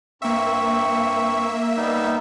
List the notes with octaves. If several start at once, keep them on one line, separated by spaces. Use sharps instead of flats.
G2 A#3 C4 E5 C#6
G3 B3 D#4